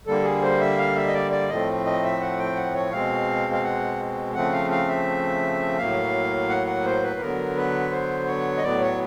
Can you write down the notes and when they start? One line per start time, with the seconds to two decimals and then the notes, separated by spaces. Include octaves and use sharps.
0.07 D3 G3 A#3 A4
0.24 G#4
0.42 C5
0.60 E5
0.78 F5
0.96 E5
1.07 D#5
1.14 D5
1.32 D5
1.49 A2 F3 A3 C4 D#5
1.85 D#5
2.03 E5
2.20 F#5
2.39 G5
2.56 F#5
2.74 C#5
2.92 B2 G#3 C4 F5
3.53 F5
3.63 F#5
4.34 C#3 F3 A3 C4 F#5
4.53 F5
4.71 F5
4.88 E5
5.78 A2 F#3 A#3 F5
6.49 F#5
6.67 F#5
6.85 C5
7.03 B4
7.20 D3 F#3 B3 A#4
7.56 B4
7.92 C5
8.27 C#5
8.58 D#5
8.63 A2 F#3 B3 D5
8.81 C#5